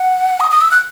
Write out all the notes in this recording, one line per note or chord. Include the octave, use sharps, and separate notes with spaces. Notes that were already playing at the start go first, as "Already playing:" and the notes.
Already playing: F#5
D#6
D#6
E6
F#6